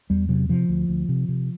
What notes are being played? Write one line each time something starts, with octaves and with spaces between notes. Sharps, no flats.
E2 G3
C3 F#3
C3 F3
D2
D2
C3
C3